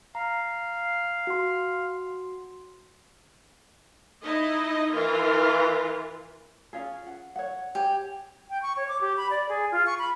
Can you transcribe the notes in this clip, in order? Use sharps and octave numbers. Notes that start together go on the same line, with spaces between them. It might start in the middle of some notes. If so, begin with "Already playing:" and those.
F5 A#5
F#4 C6
D#4 E4 D#5
E3 F4 A#4
C#4 F4 G#4
F#5
C#5 F#5
G4 C#5 G#5
G5
C#6
C#5
D6
G4
B5
D5
G#4
F4
C#6
B5